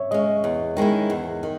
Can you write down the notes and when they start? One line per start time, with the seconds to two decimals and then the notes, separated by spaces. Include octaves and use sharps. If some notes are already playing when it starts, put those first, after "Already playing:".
Already playing: C#5 E5
0.11 G#3 C#4 D#5
0.44 E2
0.77 D#3 G#3 C#4 E4
1.10 E2
1.43 D#3